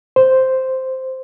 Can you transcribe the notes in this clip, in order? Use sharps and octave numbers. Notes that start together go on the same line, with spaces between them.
C5